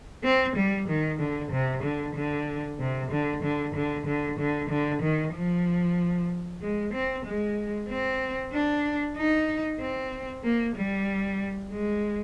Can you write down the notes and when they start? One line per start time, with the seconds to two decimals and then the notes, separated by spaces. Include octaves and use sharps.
0.24 C4
0.56 G3
0.88 D#3
1.19 D3
1.52 C3
1.83 D3
2.15 D3
2.79 C3
3.11 D3
3.43 D3
3.75 D3
4.06 D3
4.39 D3
4.69 D3
5.02 D#3
5.34 F3
6.61 G#3
6.93 C4
7.25 G#3
7.89 C4
8.52 D4
9.16 D#4
9.80 C4
10.44 A#3
10.76 G3
11.71 G#3